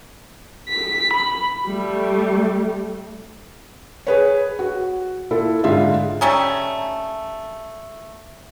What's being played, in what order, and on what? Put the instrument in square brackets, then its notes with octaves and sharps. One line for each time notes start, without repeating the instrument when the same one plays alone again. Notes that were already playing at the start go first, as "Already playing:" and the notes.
[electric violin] B6
B5
[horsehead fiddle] G3 A3
[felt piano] G#4 B4 C#5
F#4
A#2 E4 A4
G#2 D3 F4 E5
[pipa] G3 A3 C#4 D#4